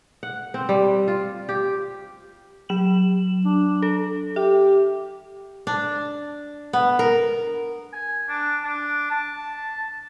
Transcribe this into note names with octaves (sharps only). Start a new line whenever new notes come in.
F#5
C4
G3
F4
G4
F#3 E7 F#7
D4
A4
G4 E5
D4
B3
A#4
G#5
D4
D4
A5